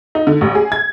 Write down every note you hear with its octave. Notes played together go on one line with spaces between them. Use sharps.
D#4
D3
A1
G#4
G#6